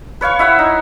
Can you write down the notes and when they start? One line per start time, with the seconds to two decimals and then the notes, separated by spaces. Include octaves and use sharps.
0.21 B4 C#5 F5 C#6
0.39 E4 E5 F#5
0.59 D#4